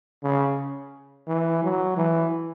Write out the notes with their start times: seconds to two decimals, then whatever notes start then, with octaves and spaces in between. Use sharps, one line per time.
0.24 C#3
1.27 E3
1.63 F#3
1.97 E3